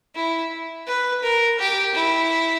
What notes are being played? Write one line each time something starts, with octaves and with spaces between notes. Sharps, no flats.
E4
B4
A#4
G4
E4